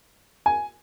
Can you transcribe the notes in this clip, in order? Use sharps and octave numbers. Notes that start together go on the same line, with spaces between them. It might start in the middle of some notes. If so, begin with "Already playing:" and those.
G#5